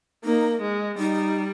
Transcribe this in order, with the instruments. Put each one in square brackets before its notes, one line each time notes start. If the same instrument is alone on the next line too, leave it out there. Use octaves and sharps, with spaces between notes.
[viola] A#3 [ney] D#4
[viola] G#3
[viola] G3 [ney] D#4